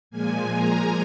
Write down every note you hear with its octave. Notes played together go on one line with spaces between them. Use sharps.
A#2 F3 G#3 G#5
A#5